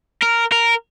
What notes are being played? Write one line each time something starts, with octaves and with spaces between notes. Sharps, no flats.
A#4
A#4